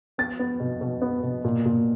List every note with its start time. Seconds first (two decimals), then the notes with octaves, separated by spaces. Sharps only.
0.18 B3 A6
0.39 B3
0.60 B2
0.81 B2
1.02 B3
1.23 B2
1.44 A#2
1.65 A#2